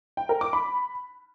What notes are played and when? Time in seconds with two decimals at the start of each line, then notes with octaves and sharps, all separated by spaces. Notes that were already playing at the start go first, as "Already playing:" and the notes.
0.17 G5
0.29 A#4
0.41 D6
0.53 B5